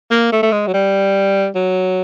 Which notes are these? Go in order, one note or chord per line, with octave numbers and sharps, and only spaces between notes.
A#3
A3
A3
G#3
F#3
G3
F#3